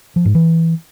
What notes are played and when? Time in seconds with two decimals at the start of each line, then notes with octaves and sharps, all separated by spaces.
0.16 F3
0.25 G#2
0.35 E3